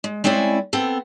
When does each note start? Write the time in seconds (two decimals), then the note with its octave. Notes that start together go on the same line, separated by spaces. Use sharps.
0.04 G#3
0.24 G#3 C4 C#4 E4 D5
0.73 B3 C4 A4